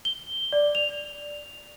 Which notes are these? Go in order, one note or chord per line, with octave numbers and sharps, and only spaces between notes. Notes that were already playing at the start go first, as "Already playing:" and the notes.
G7
D5
F7